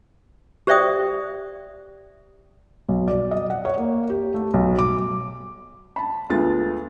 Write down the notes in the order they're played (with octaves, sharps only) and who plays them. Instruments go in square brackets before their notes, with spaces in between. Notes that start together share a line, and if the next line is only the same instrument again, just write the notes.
[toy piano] G4 C5 D5 E5 G5 D#6
[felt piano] B1
D5
D#5
F#5
C#5
A#3
G4
A3
B1
D6
A5 B5
D2 G#3 B3 F4 A6